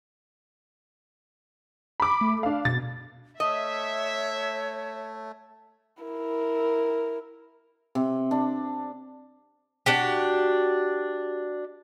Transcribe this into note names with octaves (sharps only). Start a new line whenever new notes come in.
B5 D6
A3
D4 F5
B2 A6
A3 C#5 D#5 E5
E4 A#4
C3
D4
D4 F#4 G4